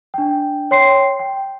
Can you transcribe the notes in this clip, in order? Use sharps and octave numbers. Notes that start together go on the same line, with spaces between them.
D4 G5
C#5 G5 C6 C7
G5